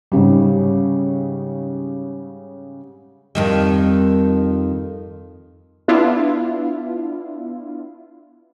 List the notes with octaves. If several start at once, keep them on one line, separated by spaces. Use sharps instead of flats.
G#2 C#3 G3
F2 D#3 G3
B3 D4 E4 F4